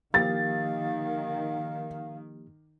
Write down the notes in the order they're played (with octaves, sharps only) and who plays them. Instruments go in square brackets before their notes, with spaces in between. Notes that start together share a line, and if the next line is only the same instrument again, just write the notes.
[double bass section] D#3 [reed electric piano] F3 A#3 G4 [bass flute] F5 [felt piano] A6